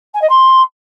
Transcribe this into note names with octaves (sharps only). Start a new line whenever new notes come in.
G#5
D#5
C6